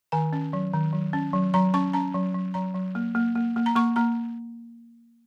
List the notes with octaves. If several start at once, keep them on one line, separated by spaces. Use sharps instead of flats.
D#3 G#5
C#4
F#3
D#3
F#3
C#4
F#3
F#3 A#5
C#4 C#6
C#4 A#5
F#3
F#3
F#3 A#5
F#3
A#3
A#3
A#3
A#3
A#5
A#3 C#6
A#3 A#5